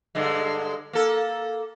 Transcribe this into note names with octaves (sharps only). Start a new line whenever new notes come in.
G2 D3 G#3
A#3 A4